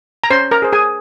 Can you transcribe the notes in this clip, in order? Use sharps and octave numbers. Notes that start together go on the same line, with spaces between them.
A#5
C#4 C5 C6
A#4 A#5
G#4 C5
G#4 G#5